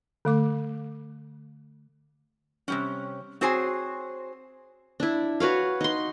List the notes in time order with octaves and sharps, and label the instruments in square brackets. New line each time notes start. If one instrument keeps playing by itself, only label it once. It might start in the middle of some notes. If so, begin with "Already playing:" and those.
[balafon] D3 A3 D6
[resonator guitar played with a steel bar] C3 G3 C#4
C4 F#4 G#4 C5 C#5 G#5
[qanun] D4 E4
F#4 B4 C#5 F5
D#4 C6